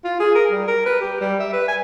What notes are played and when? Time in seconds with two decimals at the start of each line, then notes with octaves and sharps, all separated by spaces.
0.04 F4
0.20 G#4
0.35 A#4
0.51 G3
0.68 A#4
0.86 B4
1.01 G4
1.21 G3
1.40 E5
1.53 B4
1.68 G#5